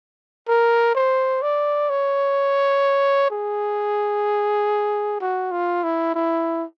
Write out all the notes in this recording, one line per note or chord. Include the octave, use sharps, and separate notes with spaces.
A#4
C5
D5
C#5
G#4
F#4
F4
E4
E4